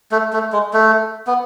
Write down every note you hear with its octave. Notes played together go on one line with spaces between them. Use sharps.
A3
A3
G#3
A3
B3